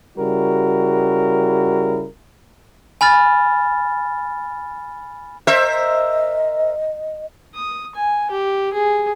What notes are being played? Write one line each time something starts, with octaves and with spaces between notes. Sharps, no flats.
C#3 G3 E4 F#4 A#4
G#5 B5 F6 A6
A#4 C5 D#5 E5
D#6
G#5
G4
G#4